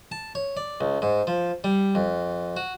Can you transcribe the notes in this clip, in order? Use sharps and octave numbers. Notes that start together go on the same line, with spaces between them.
A5
C#5
D5
C#2
G#2
F3
G3
F2
F#4